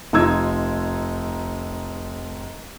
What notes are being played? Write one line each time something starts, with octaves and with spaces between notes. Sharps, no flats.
F1 D#4 F4 E6 G#6